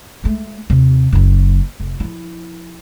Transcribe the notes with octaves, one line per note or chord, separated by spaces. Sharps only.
G#3 A3
D#2 C3
F#1 F#3
F1
F3 E4